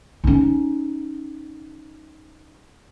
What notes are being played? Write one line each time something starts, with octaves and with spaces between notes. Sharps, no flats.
C#4 D#4